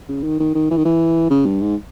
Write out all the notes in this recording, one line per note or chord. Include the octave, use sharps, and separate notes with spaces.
C#3
D#3
D#3
D#3
E3
D#3
E3
C#3
G2
G#2